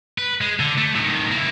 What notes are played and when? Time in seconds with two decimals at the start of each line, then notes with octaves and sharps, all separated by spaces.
0.18 B4
0.41 G#3
0.60 D3
0.78 A3
0.95 A2 D#3
1.31 A#3 E4